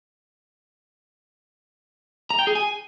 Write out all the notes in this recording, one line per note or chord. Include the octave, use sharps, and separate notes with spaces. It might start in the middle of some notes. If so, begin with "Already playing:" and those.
A#5
G5
G#4
G#5